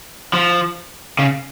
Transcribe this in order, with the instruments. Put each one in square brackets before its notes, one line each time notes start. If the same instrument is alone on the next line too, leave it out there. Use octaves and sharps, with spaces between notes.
[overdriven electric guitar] F3
C#3